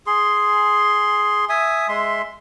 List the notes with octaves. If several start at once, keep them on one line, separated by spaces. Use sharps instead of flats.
G#4 C6
E5 G#5 D#6
G#3 E5 C6